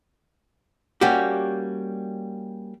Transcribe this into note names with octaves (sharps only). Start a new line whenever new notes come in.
G3 A#3 C#4 F#4 G4